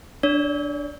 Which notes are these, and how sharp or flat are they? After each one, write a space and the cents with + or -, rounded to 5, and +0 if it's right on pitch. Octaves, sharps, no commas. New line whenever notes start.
D4 +0 C#5 +40